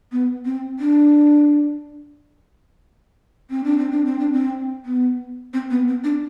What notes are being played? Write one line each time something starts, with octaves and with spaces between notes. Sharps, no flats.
B3
C4
D4
C4
D4
C4
D4
C4
D4
C4
B3
C4
B3
C4
D4